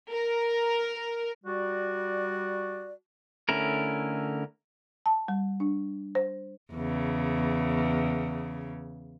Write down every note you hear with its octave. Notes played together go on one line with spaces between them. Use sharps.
A#4
G3 F#4 D5
D3 A3 C#4 E4 A#4
A5
G3
D4
C5
E2 C#3